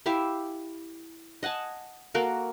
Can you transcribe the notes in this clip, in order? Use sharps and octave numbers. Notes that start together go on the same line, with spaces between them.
E4 G4 E5 F5
D#5 F#5 G#5 A5
A#3 F#4 A4 A#4